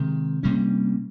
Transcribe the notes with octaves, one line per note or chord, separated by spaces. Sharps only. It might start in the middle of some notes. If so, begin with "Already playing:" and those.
Already playing: C3 D#3 G#3
C3 G3 A#3 C#4